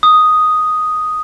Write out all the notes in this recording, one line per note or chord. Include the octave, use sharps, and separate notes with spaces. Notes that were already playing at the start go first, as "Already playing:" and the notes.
D#6